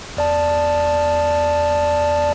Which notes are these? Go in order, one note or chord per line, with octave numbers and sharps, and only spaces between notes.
E2 D5 A5